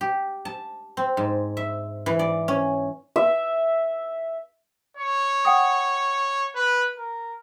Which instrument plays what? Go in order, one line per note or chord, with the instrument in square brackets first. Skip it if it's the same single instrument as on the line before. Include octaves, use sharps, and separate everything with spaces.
[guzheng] G4
A5
C4
G#2
E5
E3
D5
C#4
[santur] E5
[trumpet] C#5
[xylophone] F#5 G5 D#6
[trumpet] B4
A#4